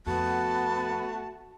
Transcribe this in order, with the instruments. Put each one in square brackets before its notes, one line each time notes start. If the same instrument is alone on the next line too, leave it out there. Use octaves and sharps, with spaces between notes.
[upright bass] F2 C#4 [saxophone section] A3 F#4 [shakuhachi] B3 [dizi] A5